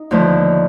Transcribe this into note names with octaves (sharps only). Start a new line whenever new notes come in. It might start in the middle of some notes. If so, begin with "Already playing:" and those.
Already playing: D#4
D#2 D3 F3 A3